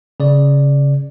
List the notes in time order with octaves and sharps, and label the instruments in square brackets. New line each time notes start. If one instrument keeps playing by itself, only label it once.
[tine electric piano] C#3 D5